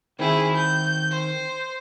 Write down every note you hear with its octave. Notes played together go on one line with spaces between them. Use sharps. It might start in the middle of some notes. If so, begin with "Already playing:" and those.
D#3 C4 E4 G#4
G6
C5